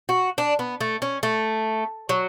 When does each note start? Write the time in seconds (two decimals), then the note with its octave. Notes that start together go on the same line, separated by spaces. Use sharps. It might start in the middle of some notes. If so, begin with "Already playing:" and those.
0.09 F#4
0.38 D4
0.59 B3
0.81 A3
1.02 C#4
1.23 A3
2.09 F#3